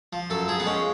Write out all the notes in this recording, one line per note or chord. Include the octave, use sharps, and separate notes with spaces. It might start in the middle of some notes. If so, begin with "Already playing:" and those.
F3
F#2 A4
F3 G#4
B3
G#3 C#4